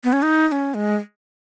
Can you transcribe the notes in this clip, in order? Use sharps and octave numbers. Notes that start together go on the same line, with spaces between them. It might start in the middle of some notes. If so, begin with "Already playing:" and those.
B3
C#4
D#4
D#4
C#4
G#3